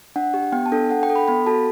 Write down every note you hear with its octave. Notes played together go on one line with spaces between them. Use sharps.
D4 F#5
G4
B3 G5
A5
D4 A4
G5
D4 F#5
G5
A4
B5
B3 B5
F#4 A4 A5